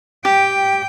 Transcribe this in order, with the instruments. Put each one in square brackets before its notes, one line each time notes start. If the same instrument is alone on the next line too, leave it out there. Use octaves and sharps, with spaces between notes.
[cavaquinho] G4 [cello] G5